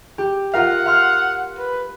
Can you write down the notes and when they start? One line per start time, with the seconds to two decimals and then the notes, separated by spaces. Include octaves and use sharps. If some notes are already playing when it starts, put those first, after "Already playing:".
0.18 G4
0.53 F4 A#4 F5 F#5
0.86 F5 C6 F6
1.58 B4